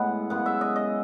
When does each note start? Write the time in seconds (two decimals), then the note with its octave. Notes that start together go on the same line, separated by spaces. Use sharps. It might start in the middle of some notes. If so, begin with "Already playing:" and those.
Already playing: A2 G#3 B3 F#5
0.30 F#2 C#3 G#3 B3 F#5
0.46 E5
0.61 D#5
0.76 D#5